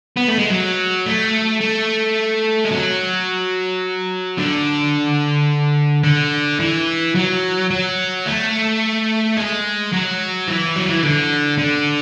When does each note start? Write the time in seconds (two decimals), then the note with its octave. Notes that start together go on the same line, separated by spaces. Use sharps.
0.16 B3
0.28 A3
0.38 G#3
0.50 F#3
1.06 A3
1.61 A3
2.65 G#3
2.72 F#3
4.38 D3
6.04 D3
6.60 E3
7.15 F#3
7.70 F#3
8.26 A3
9.37 G#3
9.93 F#3
10.48 E3
10.76 F#3
10.89 E3
11.03 D3
11.58 D3